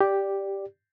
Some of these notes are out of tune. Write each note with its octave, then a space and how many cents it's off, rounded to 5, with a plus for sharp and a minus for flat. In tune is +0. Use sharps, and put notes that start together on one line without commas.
G4 +0 D5 +0